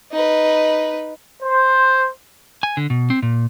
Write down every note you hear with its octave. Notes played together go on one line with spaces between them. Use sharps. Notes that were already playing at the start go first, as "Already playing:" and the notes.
D#4 B4
C5
G#5
D3
B2
C4
A#2